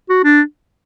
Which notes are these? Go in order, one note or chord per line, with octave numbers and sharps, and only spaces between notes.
F#4
D4